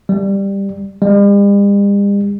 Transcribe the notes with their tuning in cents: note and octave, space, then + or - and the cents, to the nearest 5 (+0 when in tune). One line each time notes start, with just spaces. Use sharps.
G3 +10
G3 +45